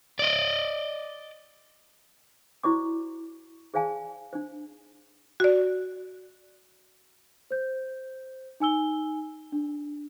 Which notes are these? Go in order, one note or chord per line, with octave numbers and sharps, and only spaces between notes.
D5 D#5
E4 F#4 C5 D5 C#6 D6
G#4 C5 D5 F5 G#5 A5
D4 C5
F#4 D5
C5 G6
D#4 G#5 E6 G7
D4